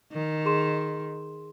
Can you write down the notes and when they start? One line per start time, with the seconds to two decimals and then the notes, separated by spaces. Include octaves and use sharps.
0.12 D#3
0.45 G#4 C6 E7